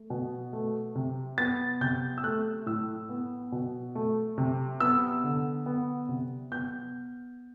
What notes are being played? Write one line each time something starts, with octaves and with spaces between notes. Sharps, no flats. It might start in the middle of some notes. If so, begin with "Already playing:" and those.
Already playing: A3
B2
A3
C3
B3 A6
C3 G6
E6
A3 F#6
A2 E6
B3
B2
A3
C3
B3 E6
D3
B3
C3
B3 G6